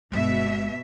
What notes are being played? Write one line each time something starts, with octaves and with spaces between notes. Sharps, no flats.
G1 B2 G#3 E5